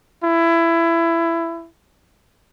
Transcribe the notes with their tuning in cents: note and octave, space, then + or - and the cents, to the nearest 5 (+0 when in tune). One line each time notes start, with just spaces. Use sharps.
E4 +20